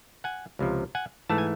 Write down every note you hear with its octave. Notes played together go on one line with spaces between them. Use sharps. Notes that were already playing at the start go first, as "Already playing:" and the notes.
F#5 G#5
C#2 C3 F3
F#5 G#5
G#2 E3 A3 A5
G#5